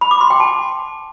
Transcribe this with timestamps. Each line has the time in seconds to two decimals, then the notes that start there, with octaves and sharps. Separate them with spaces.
0.01 B5
0.11 D6
0.21 C6
0.30 G5
0.40 A5